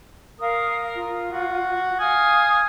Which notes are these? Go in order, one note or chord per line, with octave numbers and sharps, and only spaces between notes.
A#4 F5 D#6
F4
F#4
F5 G#5 D#6 F6